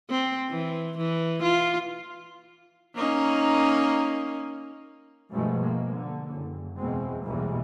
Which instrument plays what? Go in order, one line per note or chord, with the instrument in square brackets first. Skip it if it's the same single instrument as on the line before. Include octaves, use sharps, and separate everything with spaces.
[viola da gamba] C4
E3
E3
F4
A#3 C#4 D#4
[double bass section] G2 B2 F3 G#3 A3
A#3
D3
F#1
E2 B2 G#3 C4
B1 E2 A#2 E3 G3 G#3